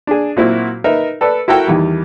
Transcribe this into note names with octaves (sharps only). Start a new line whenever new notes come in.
D4 G#4
A#2 F#3 A#3 C4 E4 F#4
D#4 A#4 B4 E5
A4 B4 D5
E4 F#4 A4 A#4 G5 A5
E2 D#3 G3